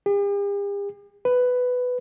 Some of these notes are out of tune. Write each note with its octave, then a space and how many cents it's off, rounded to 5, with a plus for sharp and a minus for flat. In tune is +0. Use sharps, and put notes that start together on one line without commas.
G4 +45
B4 +10